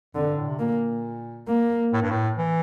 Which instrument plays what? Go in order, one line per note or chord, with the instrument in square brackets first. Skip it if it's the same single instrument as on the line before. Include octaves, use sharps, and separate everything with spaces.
[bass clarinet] F2 [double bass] D3
[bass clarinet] G2
A2
C3
[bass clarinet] A#2 [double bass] A#3
[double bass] A#3
[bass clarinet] A2
G2
A2
E3